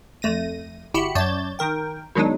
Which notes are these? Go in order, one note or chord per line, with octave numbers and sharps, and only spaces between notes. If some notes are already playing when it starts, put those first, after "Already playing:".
F2 A3 A#6 D#7
G1 E4 F#4 G4 B5 C#7
F#2 C#5 D5 A5 G6 A6
D#3 A#4 G5
B2 D#3 F#3 G#3 D4 D#4